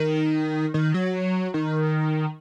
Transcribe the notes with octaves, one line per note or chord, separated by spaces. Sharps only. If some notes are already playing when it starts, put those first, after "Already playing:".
Already playing: D#3
D#3
F#3
D#3